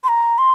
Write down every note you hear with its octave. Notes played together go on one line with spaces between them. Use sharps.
C6
A#5
C6